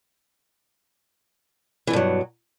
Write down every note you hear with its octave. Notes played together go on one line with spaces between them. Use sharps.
G2 B2 E3 F#3